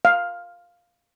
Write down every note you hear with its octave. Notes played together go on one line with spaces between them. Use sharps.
F5